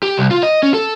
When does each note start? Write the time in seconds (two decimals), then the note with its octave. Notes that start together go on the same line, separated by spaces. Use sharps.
0.03 G4
0.18 C2
0.31 F4
0.43 D#5
0.63 C#4
0.74 A4